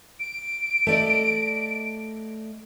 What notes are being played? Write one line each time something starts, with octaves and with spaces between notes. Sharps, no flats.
D7
A3 D5 D#5